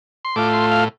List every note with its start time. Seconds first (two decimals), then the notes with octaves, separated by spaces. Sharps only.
0.25 C6
0.36 A2 A3 F4 D6
0.54 C6
0.71 F5